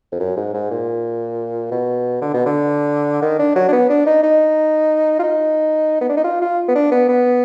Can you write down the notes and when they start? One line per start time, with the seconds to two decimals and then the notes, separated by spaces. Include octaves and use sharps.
0.12 F2
0.20 F#2
0.36 G#2
0.54 G#2
0.70 A#2
1.71 B2
2.21 D3
2.33 B2
2.46 D3
3.22 D#3
3.39 D4
3.55 F#3
3.68 D4
3.72 B3
3.89 D4
4.06 D#4
4.23 D#4
5.19 F4
5.23 D#4
6.01 B3
6.09 D4
6.17 D#4
6.24 F4
6.41 F4
6.68 B3
6.75 D4
6.92 B3
7.08 B3